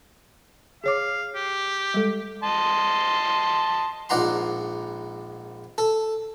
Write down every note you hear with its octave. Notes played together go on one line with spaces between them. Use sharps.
G#4 C#5 F5 D6
G4
G3 G#3 A4
D#5 A5 C6
A#1 G#2 D5 F#5 A#5 C6
A4